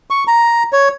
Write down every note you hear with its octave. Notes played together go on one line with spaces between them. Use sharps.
C#6
A#5
C#5